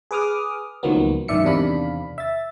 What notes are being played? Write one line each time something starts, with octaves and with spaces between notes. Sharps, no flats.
G#4 B4 D6 D#6 F6
C#2 D#3 F3 F#3 A#3 B3
G#1 F#2 D#3 D5 E5 C#7
E2 C3 D#3 D4 F5 B5
E5 A6